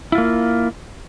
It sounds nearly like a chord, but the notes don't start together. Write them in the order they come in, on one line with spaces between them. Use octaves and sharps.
E4 F4 A#3